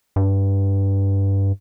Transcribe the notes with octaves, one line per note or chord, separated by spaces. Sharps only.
G2